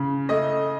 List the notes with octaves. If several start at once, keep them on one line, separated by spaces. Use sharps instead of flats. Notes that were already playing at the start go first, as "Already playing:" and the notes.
Already playing: C#3
A3 D#5